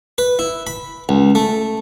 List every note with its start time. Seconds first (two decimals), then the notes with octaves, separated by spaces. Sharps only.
0.18 B4
0.39 E4
0.67 B5
1.09 C#2
1.35 A3